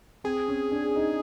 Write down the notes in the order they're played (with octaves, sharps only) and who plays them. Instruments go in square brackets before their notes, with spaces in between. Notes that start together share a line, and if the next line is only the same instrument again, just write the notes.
[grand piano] C4 [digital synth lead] G#4
[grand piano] C#4
D4
D#4